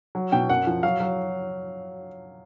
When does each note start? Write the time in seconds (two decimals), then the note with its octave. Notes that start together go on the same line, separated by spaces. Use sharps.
0.15 F#3
0.32 B2 G5
0.49 F#2 F#5
0.67 F3
0.83 F#3 F5
1.00 F#3